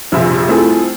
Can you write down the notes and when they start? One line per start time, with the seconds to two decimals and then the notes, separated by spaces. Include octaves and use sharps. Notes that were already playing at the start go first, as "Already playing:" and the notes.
0.12 A#1 F2 C3 F4 G#4 E5
0.48 A3 C4 E4 F4 G#4 A4